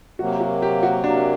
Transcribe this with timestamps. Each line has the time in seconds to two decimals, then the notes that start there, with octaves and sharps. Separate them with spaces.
0.19 C3 F#3 A#3 F#4
0.40 F#4
0.62 G4
0.83 F#4
1.04 C3 F#3 A#3 D4